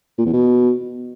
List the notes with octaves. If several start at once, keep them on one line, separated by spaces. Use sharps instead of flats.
A#2
E2
B2